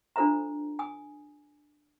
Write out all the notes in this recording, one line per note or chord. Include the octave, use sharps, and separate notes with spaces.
D4 F4 A4 C5 E5 A#5
G#5 D#6